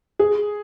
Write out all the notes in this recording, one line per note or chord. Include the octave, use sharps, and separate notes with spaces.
G#4